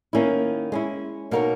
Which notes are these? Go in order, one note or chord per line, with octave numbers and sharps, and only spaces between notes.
D#3 A#3 C#4 E4
G#3 C#4 E4
B2 A#3 D#4 A#4 C#5